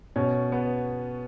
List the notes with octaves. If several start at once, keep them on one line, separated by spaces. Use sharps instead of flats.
B2 C#4
B3